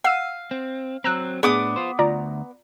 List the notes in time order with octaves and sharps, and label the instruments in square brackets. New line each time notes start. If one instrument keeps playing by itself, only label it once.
[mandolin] F5 [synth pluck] F#5 E6 D#7
[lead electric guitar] C4
[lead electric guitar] F#3 C4 [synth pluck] A#5 E6 F#6
[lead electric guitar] A2 D4 [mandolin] B3 D6 D#6 [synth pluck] G#4
[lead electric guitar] F4 C5
[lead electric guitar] D2 [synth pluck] F4 D5 A#5